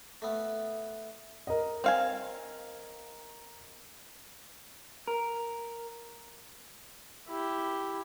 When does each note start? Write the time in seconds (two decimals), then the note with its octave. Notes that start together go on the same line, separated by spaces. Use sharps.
0.22 A3 B3
1.47 A#4 D#5
1.84 C4 F5 G#5
5.08 A#4
7.28 E4 G4